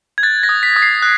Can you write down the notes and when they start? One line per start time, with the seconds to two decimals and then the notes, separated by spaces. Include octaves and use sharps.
0.18 G#6
0.23 F#6 A6
0.43 A#6
0.49 D#6
0.63 B6
0.76 D#6
0.82 C7
1.02 F#6